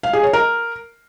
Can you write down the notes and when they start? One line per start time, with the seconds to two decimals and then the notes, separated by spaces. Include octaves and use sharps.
0.03 F5
0.13 G#4
0.23 C#5
0.33 A#4